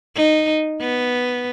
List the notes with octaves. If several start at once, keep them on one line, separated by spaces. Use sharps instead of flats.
D#4
B3